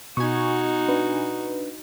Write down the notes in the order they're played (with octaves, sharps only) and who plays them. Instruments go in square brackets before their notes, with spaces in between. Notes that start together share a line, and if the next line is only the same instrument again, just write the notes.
[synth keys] B2 G#5 [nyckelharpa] D#4 F#4 [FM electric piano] C#6
[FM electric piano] D4 B4